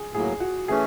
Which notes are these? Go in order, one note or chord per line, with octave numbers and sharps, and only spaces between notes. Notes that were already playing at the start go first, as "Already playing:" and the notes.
Already playing: G#4
A2 F#3 A#3 G#4
F#4
E3 A3 C#4 G#4